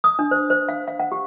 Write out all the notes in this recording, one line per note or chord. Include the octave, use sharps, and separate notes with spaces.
D#6
D4
C5
C5
F5
F5
F#5
G4